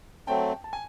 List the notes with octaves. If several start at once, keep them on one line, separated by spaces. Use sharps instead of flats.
F#3 A3 C4 G5 A5
A5
G#5